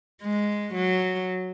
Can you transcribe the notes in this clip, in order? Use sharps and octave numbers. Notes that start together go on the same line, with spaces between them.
G#3
F#3